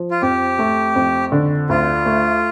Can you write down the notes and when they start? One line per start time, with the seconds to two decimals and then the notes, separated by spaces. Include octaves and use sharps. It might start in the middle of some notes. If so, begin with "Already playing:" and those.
Already playing: F3
0.11 F4
0.22 F2 G4
0.59 A3
0.95 F2
1.32 D3
1.69 D2 F4
2.06 A3